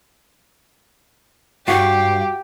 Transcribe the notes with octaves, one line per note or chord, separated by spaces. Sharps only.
G2 F#4 G4 F5